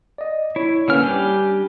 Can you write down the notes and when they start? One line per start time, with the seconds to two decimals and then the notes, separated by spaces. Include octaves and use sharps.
0.18 D5 D#5
0.56 E4 C#5
0.88 D3 A#3 C#4 B4 F6
1.02 G3 D4 G4 G#5